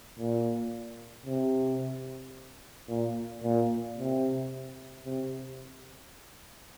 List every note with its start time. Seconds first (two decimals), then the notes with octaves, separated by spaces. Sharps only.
0.18 A#2
1.26 C3
2.88 A#2
3.43 A#2
3.97 C3
5.05 C3